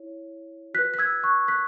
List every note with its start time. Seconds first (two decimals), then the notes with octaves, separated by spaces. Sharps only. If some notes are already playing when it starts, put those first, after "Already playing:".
Already playing: E4 C#5
0.74 F#4 F#6 B6
0.78 B4
0.94 B6
0.99 E6 G#6
1.23 C#6 F#6
1.48 F#6 B6